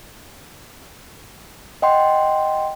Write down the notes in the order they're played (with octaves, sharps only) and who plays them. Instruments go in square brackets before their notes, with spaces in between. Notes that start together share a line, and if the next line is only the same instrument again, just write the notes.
[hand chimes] D#5 F#5 G5 C6